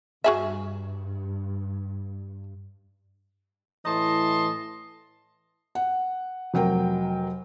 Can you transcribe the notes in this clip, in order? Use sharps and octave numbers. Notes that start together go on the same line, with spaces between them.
G2 F#4 G#4 E5
A2 E3 D#5 A5 C6
F#5
F1 F#3 A#4 G5